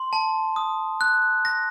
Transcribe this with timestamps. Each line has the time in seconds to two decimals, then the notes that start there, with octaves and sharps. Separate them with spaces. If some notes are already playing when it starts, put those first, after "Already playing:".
Already playing: C6
0.13 A5
0.56 D#6
1.01 F#6
1.45 A#6